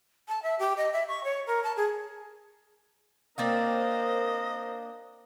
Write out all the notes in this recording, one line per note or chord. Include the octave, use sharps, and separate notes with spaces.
A5
E5
G4
D#5
E5
C#6
C#5
A#4
A5
G#4
A#3 C4 D4 A#4 C5 D#5 F5 A6